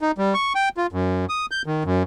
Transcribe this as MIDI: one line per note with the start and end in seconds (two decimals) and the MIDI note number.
0.01 0.11 63
0.18 0.34 55
0.34 0.53 85
0.55 0.69 79
0.77 0.87 65
0.92 1.25 42
1.29 1.46 87
1.51 1.62 91
1.66 1.83 51
1.85 2.03 42